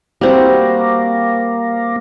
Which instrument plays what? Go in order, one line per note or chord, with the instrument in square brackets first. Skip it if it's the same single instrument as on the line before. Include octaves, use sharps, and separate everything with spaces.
[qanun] G3 C4 F#4 [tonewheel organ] A#3